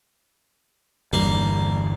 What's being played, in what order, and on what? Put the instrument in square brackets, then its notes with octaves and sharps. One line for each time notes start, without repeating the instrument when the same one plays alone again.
[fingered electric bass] G1 E2 D3 [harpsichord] G3 A#3